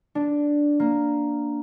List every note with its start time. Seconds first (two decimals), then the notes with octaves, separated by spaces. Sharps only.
0.15 D4
0.80 A#3